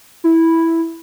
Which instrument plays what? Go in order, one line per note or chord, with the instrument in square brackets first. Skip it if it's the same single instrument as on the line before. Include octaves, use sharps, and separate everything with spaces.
[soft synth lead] E4